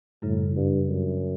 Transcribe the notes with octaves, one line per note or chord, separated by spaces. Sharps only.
F#2 A2 C#3 G3
G2
F#2